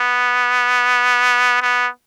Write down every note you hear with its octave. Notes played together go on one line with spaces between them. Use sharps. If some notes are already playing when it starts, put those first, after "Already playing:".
Already playing: B3
B3